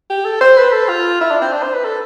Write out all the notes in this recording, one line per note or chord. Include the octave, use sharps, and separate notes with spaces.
G4
A4
C5
B4
A4
F4
E4
D4
C4
D4
C5
B4
A4